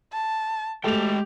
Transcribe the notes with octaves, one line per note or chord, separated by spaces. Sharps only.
A5
G#3 A3 G4 G5 F7